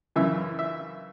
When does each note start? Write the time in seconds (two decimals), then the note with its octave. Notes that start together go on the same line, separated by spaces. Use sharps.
0.16 F#2 C#3 E3 E5
0.59 E5